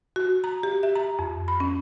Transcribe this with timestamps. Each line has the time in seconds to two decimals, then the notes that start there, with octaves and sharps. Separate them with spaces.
0.16 F#4
0.44 A#5
0.63 G4
0.83 E5
0.95 A#5
1.19 F2
1.48 B5
1.60 C#4